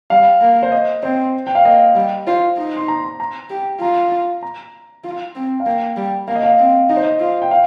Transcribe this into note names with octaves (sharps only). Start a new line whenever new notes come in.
G3 F5
A#3
C5
D#5
C4 C5
G5
F5
A#3 D#5
G3
F4 C5
D#4
C6
A#5
C6
A#5
G4
F4 A#5
A#5
F4
C4
F5
A#3 G5
G3
A#3 F5
D#5
F5
C4
D#4 D#5
C5
D#5
F4
G5
F5